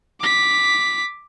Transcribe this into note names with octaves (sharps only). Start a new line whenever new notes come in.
D6 B6